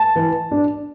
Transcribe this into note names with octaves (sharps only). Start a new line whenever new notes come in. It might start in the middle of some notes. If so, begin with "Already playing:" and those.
Already playing: A5
E3
D4